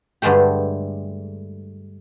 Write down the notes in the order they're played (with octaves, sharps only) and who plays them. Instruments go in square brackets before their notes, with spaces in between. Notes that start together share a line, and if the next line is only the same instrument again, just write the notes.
[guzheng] G2 D3 G#3 A3 G4